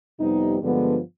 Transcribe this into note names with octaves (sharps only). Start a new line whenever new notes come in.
F2 C3 G3 B3 D#4
G2 D3 F3 G#3 B3